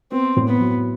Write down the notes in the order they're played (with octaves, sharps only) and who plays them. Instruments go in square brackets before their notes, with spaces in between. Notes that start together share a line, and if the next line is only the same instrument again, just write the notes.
[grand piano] B3 [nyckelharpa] C4
[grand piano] A2
[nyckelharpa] B3
[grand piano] F#3